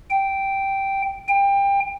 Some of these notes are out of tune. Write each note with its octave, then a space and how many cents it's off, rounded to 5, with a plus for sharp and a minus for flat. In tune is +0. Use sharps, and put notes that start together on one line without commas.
G5 -5
G5 +25